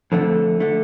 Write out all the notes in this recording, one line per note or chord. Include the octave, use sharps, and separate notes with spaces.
F2 D3 A3
D3 A3